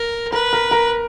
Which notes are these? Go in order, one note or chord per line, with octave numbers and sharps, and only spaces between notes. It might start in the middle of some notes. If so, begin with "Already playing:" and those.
Already playing: A#4
A#4 B4
A#4
A#4